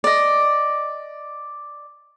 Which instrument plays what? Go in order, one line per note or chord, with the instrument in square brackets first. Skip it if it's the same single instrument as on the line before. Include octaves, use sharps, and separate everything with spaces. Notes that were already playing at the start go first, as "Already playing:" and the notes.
[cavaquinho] D5 D#5